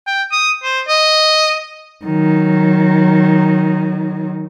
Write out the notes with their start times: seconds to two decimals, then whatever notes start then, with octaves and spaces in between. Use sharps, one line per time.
0.07 G5
0.31 D#6
0.63 C5
0.88 D#5
2.05 D#3 F#3